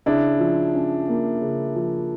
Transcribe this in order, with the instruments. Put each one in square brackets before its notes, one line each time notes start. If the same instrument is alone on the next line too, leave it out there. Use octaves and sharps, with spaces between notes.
[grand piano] C#3 [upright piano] D4 E4
[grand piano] F3
C#4
A#3
C#3
F3